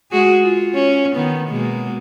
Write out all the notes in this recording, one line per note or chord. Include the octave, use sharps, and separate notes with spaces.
G#3 F#4 G#4
F4
C#4
D#3 B3
B2 G#3 A#3